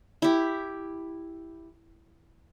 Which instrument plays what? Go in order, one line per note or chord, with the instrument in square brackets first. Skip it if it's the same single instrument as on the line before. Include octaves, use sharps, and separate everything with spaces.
[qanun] E4 G4